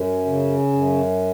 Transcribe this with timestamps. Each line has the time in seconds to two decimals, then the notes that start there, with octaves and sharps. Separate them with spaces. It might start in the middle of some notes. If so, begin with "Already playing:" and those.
Already playing: F#2
0.26 C#3
0.73 F#2